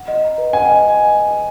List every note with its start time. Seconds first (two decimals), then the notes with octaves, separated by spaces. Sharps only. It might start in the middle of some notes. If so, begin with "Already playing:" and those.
Already playing: F#5
0.08 D#5
0.24 A#5
0.38 B4
0.53 F#5 G#5
0.69 D#5